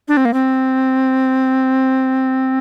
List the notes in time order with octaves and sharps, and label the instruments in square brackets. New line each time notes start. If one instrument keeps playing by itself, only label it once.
[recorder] D4
C4
A#3
C4